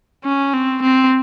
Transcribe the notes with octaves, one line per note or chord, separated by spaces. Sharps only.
C#4
C4
C4